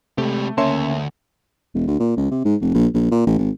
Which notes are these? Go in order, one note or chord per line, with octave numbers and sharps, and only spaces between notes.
C3 G#3 A3 G4
D2 C#3 A#3 C#5 E5 A5 C6
E1
D2
A#2
C#2
C3
G#2
F1
A#1
A#1
A#2
A1
G#1